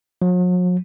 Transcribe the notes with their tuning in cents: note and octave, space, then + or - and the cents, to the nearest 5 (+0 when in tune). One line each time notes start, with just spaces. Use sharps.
F#3 -45